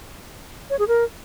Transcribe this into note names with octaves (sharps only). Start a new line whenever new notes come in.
C#5
G#4
A#4